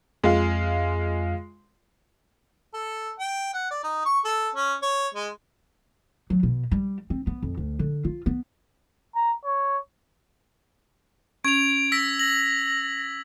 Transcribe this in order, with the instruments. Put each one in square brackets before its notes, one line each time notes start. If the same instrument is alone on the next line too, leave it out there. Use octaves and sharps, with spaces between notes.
[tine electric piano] F2 [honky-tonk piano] G#3 F4
[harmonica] A4
G5
F#5
D5
D#4
C#6
A4
C#4
C#5
G#3
[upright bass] F#3
B2
G3
C4
B3
F2
D2
D3
F4
B3
[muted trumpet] A#5
C#5
[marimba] C#4 [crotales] G#6 F7 [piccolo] D7
[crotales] E6 A#6 B6
[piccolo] A#6 [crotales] F#7